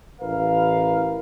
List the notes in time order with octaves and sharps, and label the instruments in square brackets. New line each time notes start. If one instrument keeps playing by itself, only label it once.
[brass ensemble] A1 A#4 B4 F5